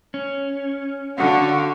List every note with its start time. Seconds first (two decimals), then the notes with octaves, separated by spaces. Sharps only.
0.14 C#4
1.18 D3 F#4 F5